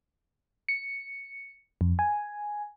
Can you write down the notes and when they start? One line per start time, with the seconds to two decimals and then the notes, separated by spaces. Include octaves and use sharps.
0.69 C#7
1.81 F2
1.99 G#5